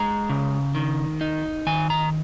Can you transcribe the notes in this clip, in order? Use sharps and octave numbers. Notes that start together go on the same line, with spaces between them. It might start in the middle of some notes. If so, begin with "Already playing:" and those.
Already playing: G#3 A#5
C#3
D#3
D#4
D#3 G#5
A#5